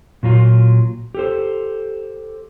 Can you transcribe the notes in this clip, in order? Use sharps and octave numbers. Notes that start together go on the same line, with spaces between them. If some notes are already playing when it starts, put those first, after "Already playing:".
A#2 F#3 F4
G4 A4 C5